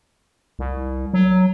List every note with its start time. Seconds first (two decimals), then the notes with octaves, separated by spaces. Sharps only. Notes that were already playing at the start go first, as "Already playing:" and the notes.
0.59 C2
1.14 F#3